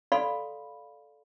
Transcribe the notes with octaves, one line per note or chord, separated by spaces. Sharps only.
A4 D5 F5 B5 C6